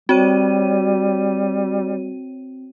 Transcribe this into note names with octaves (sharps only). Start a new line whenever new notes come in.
G3 C4 F#4 C#5 D#7